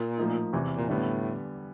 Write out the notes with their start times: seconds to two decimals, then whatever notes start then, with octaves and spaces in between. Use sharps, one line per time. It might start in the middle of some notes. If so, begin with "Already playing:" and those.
Already playing: A#2
0.18 A2 F3 A#3 D#4
0.53 E2 C3 E3
0.77 A#2
0.89 A2 D3 G3 B3